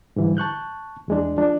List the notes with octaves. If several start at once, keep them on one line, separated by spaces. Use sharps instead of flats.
G#2 D3 E3 G3
A5 C#6 F#6 G6
E2 G#3 D4
F3 D4